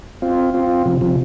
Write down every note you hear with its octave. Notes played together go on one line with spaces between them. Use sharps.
C4 F4
C4 F4
C3 F3
C3 F3